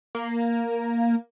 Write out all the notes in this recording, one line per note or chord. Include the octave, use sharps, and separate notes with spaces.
A#3